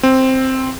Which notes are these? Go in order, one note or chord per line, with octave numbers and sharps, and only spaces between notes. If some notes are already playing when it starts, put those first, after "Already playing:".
C4